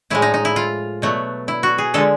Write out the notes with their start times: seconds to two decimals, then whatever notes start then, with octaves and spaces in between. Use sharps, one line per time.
0.10 A2 F3 G#3 E4
0.22 D#4
0.34 D#4
0.45 E4
0.56 F4
1.02 B2 F#3 A3
1.48 E4
1.63 F#4
1.78 G#4
1.94 D3 F3 G#3 A4